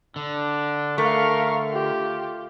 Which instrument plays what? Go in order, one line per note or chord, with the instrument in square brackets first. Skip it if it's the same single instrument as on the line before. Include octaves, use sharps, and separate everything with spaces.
[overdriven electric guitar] D3 [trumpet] D4
[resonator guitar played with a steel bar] A3 [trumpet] A#4 [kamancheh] F5 C#6
[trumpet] F4 [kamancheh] G4